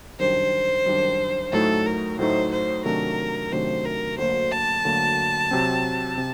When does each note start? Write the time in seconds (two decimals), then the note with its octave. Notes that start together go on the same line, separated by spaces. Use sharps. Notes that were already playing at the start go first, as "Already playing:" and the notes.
0.19 F#2 D#3 G3 D4 C5
0.86 F#2 D#3 G3 D4
1.52 A2 F#3 A3 D#4 A4
1.86 A#4
2.19 A2 F#3 A3 D#4 C5
2.52 C5
2.85 C3 D#3 F#3 A3 D4 A#4
3.52 C3 D#3 F#3 A3 D4 C5
3.85 A#4
4.18 D2 D3 F#3 A#3 C5
4.51 A5
4.85 D2 D3 F#3 A#3
5.51 C3 F#3 C4
6.18 C3